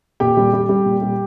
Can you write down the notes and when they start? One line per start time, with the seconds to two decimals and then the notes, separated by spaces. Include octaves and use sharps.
0.20 A#2 G4 G5
0.37 G3
0.53 G3
0.69 G3
0.86 A#2
1.02 G3